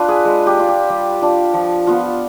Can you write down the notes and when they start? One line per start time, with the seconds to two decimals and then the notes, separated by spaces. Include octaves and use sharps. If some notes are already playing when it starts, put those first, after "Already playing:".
Already playing: D4 F4 B4
0.08 G#4
0.25 G#3
0.46 G4
0.57 D4 F4
0.68 G4
0.90 G3
1.22 D4 F4
1.54 F3
1.87 B3 F4